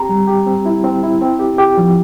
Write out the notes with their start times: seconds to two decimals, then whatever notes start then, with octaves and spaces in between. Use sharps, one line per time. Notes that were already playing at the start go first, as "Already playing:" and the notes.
Already playing: C4 G4 A#5
0.09 G3
0.27 G4
0.46 C4
0.66 E4
0.84 C4
1.03 E4
1.21 C4
1.39 G4
1.58 G4
1.77 F3